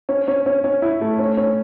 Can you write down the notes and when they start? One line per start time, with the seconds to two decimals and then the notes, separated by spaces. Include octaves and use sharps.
0.09 C#4
0.28 C#4
0.46 C#4
0.64 C#4
0.82 E4
1.01 A3
1.19 C#4
1.37 C#4